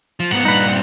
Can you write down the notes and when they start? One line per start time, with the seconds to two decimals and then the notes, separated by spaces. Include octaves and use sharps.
0.20 F3
0.32 G#2 B3 F#5
0.45 G2 A#2 D#4 B4
0.69 C4